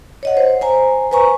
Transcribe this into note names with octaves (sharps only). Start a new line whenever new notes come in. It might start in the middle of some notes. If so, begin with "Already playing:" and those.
C#5 D#5 F#5
C5
C5 G#5 A#5
B4 C5 G#5 A#5 C#6